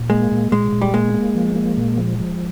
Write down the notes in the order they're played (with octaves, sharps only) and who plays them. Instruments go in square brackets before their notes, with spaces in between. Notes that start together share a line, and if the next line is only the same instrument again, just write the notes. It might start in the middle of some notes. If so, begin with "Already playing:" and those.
Already playing: [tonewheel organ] A#2
[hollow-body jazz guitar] G#3 [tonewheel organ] A#3
[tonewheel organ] A#2
[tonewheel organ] A#2 [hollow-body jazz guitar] G#3
[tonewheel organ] A#2
[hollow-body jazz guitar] G3
[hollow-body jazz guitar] G#3 [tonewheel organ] A#3
[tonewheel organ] A#3
F3
A#3
A#2
F3
F3